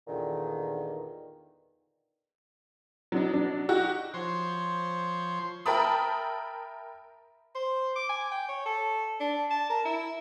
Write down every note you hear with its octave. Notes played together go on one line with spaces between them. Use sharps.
E2 A#2 D3 D#3
F#3 D4 D#4
F#3 D4
D#4 F#4 G4
F3 C5 C#5 C6
A#4 E5 G5 A5 B5 D#6
C5
D6
G#5
G5
C#5
A4
D4
A5
A#4
E4